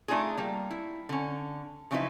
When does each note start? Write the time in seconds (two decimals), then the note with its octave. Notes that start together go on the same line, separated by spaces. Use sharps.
0.08 A3 D4 D#4 F4 G#4
0.38 G3 A#3
0.71 E4
1.09 D3 C#4
1.91 C#3 F3 F#3 D#4 E4 B4